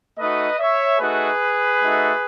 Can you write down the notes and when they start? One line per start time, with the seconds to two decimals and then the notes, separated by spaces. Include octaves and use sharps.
0.18 A3 D#4 F#4 B4 D#5
0.59 C#5 E5
1.00 A3 D#4 F#4 G#4 B4
1.82 A3 D#4 F#4